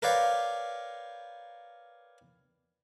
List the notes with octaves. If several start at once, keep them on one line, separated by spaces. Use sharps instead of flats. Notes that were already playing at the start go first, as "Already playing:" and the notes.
A#4 B4 C#5 D5 F5 G5